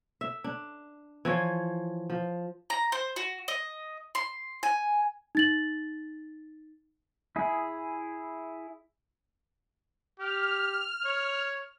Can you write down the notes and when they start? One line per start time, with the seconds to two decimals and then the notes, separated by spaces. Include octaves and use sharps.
0.21 E5
0.44 D4
1.25 E3 F3 C#5
2.10 F3
2.70 A#5
2.92 C5
3.16 F#4
3.48 D#5
4.15 C6
4.63 G#5
5.35 D#4 A6 F#7
7.36 E4 G#4
10.20 G4 F6
11.05 C#5